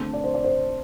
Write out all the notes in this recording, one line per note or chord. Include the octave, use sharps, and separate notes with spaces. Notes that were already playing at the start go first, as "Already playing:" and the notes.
Already playing: D3 A3 C4 A5 C6
D5
C5
D5
C5